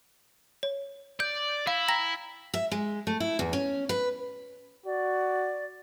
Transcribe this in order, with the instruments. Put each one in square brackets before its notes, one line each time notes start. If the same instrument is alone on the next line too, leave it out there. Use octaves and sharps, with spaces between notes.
[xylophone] C#5
[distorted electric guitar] D5 [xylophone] G6
[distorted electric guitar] E4 [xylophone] F5
[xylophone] G5 A#5 A#6
[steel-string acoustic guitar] E5
G#3
A3
E4
E2
C#4
B4
[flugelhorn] F#4 [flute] D5